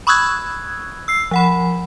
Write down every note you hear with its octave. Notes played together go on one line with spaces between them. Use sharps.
B5 C#6 D#6 E6 F#6 G#6
E6 C7
F3 F#5 B5